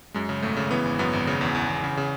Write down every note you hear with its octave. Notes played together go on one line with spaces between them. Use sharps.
F#2 G#3
C#3
G#1 A3
C#3
E3 B3
G#1
F#2 B3
G#1
C#3
E2
E2
E2
C#3
C#3